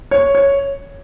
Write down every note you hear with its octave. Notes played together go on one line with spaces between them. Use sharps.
C#5
C#5